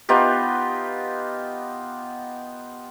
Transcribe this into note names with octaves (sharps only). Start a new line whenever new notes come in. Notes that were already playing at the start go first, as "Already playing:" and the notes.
B3 D#4 F4 G4